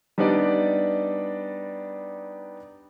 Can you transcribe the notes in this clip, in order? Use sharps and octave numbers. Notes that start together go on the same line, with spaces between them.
G3 B3 D4 D#4 D5